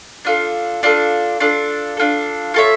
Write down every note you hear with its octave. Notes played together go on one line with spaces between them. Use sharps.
D4 F4 A4
D4 F4 A4
D4 F4 A4
D4 F4 A4
F4 A4 C#5 E5